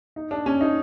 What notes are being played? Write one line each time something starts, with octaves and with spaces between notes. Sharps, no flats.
D#4
D4
C#4
D#4